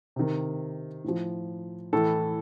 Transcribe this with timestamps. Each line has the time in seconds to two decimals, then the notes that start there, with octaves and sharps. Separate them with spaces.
0.16 C3 D#3
1.04 A2 F3
1.93 A2 E3 A4